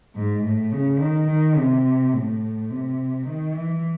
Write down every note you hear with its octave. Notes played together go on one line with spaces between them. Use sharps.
G#2
A2
C#3
D#3
D#3
C3
A2
C3
D#3
E3